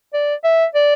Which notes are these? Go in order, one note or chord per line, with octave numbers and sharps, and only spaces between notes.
D5
E5
D5